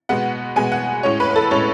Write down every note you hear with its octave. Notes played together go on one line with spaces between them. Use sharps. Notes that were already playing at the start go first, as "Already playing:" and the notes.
B2 G#3 B3 F#5
B2 G#3 B3 G#5
F#5
A2 G#3 C#4 C#5
B4
B4
A4
A2 G#3 C#4 C#5